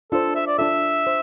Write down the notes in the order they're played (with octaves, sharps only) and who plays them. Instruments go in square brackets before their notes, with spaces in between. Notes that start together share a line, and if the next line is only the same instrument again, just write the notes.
[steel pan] D4 F4 C5 [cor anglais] A4
[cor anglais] E5
D5
[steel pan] D4 F4 A4 [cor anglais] E5
[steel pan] C5